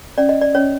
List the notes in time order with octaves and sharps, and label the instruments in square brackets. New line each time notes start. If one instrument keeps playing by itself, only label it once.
[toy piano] C#4 D5
D#5
D5
C#4 C#5